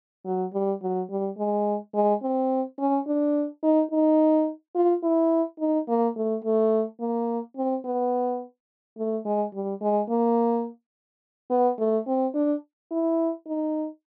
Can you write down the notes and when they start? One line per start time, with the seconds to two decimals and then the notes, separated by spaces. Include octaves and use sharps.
0.26 F#3
0.53 G3
0.82 F#3
1.10 G3
1.38 G#3
1.94 G#3
2.22 C4
2.78 C#4
3.07 D4
3.63 D#4
3.91 D#4
4.75 F4
5.03 E4
5.59 D#4
5.88 A#3
6.16 A3
6.44 A3
7.00 A#3
7.57 C4
7.85 B3
8.98 A3
9.25 G#3
9.54 G3
9.81 G#3
10.09 A#3
11.50 B3
11.79 A3
12.07 C4
12.34 D4
12.91 E4
13.47 D#4